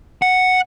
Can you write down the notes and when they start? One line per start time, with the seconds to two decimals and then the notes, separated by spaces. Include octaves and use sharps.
0.22 F#5